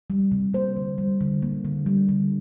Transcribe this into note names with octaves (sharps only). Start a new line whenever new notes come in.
G3
C3
A#3 C5
D3
G3
D3
A#3
D3
G3
D3